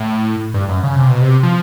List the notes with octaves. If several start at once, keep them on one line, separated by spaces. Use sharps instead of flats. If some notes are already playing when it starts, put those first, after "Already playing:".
Already playing: A2
G2
F#2
C#3
C3
B2
C3
F3